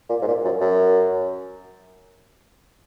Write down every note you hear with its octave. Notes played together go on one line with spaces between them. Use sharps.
A#2
G#2
A#2
F#2
F#2